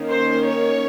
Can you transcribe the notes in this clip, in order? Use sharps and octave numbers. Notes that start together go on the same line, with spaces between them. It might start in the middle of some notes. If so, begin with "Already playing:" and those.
Already playing: D#3 A#3 C#4
C5
C#5